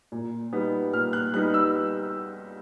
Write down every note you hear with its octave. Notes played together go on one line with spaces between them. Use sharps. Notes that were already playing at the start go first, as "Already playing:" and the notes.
A#2
G3 B3 D#4
A#2 F6
F#6
G3 B3 D#4 F#6
E6